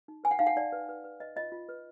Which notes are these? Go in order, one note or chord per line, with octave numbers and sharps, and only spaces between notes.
D#4
B4 G#5
F#5
D#4 F5
F#5
D#4 D5
B4
B4
B4
B4 D#5
F4 D#5
F4
B4